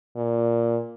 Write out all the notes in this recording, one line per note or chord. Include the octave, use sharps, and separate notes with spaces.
A#2